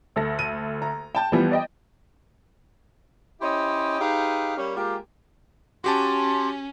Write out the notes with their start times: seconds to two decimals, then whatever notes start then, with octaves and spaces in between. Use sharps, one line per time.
0.16 D2 A4 A#6
0.39 D#7
0.82 A#5
1.15 G5 A5 G6 E7
1.32 E3 F3 G3 B3
1.51 D5 D#5 G5
3.41 C#4 E4 G4 C5 C#5 D#5
4.01 D#4 G4 G#4 B4 F5
4.56 G3 A#3 C#4
4.76 G#3 A#3 F4 G4
5.84 C#4 F#4 G4 A5 C6